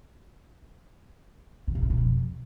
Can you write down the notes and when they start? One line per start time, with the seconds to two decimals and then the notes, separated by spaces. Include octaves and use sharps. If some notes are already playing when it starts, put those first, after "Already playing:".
1.67 C3
1.75 C#3
1.83 C3
1.90 B2
1.98 F2